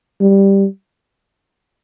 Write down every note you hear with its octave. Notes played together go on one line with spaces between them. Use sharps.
G3